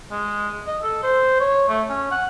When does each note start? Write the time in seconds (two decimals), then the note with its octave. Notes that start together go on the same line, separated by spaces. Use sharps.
0.12 G#3
0.67 D#5
0.83 A4
1.03 C5
1.40 C#5
1.69 A3
1.89 C#4
2.11 F#5